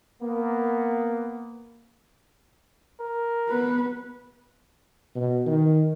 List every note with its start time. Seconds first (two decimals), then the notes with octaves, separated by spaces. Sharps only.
0.22 A#3 B3
3.00 A#4
3.49 B3 B4
5.15 B2
5.46 D#3